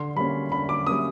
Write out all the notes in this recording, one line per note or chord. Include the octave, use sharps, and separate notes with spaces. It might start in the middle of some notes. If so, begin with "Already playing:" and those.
Already playing: D3 C6
G3 A#3 C#4 B5
D3 B5
D6
G3 A#3 C#4 D#6